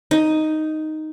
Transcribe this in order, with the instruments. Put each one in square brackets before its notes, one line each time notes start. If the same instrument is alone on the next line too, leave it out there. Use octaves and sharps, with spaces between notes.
[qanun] D#4